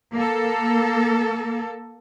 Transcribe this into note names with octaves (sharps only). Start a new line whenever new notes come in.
A#3 A4